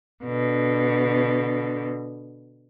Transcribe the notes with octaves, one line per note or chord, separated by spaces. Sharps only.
B2 D3